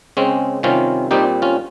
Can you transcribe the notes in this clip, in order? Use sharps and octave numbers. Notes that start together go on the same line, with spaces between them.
C#3 G#3 C4 C#4
C3 D#3 G3 C4 C#4 F4
A#2 G3 C4 D#4 G4
C#4 F4